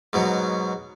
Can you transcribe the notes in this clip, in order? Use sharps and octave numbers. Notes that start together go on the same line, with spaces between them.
G#2 B2 F#3